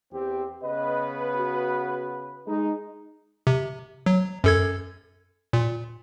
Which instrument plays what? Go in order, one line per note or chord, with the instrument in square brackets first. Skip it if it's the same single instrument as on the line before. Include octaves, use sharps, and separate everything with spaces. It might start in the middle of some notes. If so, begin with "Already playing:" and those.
[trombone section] E2 C4 G4
[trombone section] C#3 B3 B4 [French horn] D#5
[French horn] F#4
[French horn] G#3 [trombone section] D#4
[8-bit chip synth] C3
F#3
F#2 A4 G#6
A#2